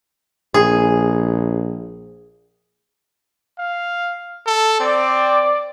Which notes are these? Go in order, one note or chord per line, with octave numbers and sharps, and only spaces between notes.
A#1 G#4
F5
A4
C4 D5